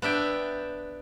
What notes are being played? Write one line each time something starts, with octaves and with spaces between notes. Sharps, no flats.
B3 D4 E5 G5